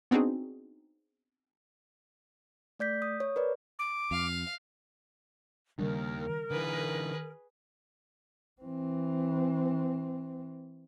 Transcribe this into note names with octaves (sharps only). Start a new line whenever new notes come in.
B3 C4 D4 D#4 F#4 G#4
A3 D5 G6 B6
D#6
C#5
A#4 B4 D5
D6
F2 F5
D#2 C#3 G3 D4 A#4
D3 E3 G#4 B4
E3 C4